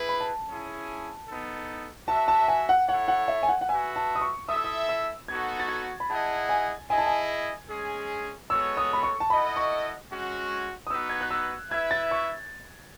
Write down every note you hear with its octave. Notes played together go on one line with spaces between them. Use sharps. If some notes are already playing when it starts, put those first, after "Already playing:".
Already playing: E4 G#4 B4
B5
A5
C#4 E4 G#4
B3 D#4 A4
F#4 B4 E5 A5
A5
G#5
F#5
E4 A4 C#5 F#5
F#5
E5
G#5
F#5
F#5
F#4 B4 E5 G#5
A5
D#6
C#6
E4 A4 E5 D#6
E6
D#6
E6
B3 D#4 F#4 A4 G#6
A6
G#6
B5
E4 G#4 D#5 F#5 A5
G#5
E4 G#4 D#5 G#5
A5
G#5
G#3 C#4 G#4
G#3 B3 F#4 A4 C#5 E6
D#6
B5
C#6
A5
E4 A4 D#5 F#5 B5
C#6
G#3 C#4 F#4
D#6
B3 D#4 F#4 B4 E6
G#6
F#6
E6
E4 B4 E5 G#6
A6
C#6